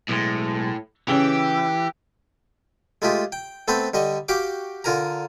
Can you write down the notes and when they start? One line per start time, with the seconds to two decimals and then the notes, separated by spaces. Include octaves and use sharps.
0.09 B1 A2 G#3
1.08 C#3 E3 C#4 G4
3.02 G#3 A3 F4 G4 G#4
3.32 G5
3.68 A3 B3 C4 A4 B4 C5
3.94 D3 G3 D#5 C#6
4.29 F#4 G4 F5 G5 D6
4.84 D3 F4 A#4 G#5 A#5